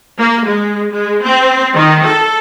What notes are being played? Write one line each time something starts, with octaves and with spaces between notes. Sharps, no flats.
A#3
G#3
G#3
C4
D#3
A4